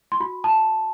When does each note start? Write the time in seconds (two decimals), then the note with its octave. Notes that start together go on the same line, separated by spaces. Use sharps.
0.12 C6
0.20 F#4 B5
0.44 A5